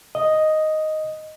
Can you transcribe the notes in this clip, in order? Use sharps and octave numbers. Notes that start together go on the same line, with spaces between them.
D#5